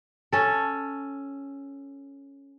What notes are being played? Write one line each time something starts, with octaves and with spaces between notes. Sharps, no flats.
C#4 A4